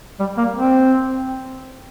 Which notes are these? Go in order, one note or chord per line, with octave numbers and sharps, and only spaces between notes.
G3
A#3
C4